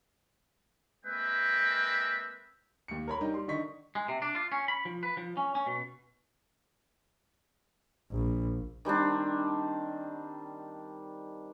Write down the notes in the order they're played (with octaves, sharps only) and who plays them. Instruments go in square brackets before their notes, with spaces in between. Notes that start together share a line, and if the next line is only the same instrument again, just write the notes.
[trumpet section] G#3 A#3 C4 B4 E5 G5
[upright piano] D#2 C#7
A#4 C#5 B5
G3 D#4 G4
G3 C6
D3 D#3 D#5 C#6 B6
[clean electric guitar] G#3
C3
D4
F4
C#4
B5
F3
B4
F3
C#4
C#4
B2
[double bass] A#1
[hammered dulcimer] D#3 G3 C4 D4